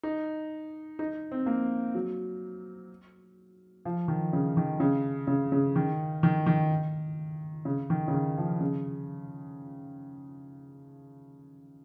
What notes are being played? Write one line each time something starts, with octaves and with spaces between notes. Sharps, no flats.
D#4
D#4
C4
A#3
F#3
F3
D#3
C#3
D#3
C#3
C#3
C#3
D#3
D#3
D#3
C#3
D#3
C#3
D#3
F3
C#3